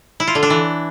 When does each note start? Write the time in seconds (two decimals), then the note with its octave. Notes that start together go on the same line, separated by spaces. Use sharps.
0.20 E4
0.27 F4
0.35 D3
0.43 D4
0.50 E3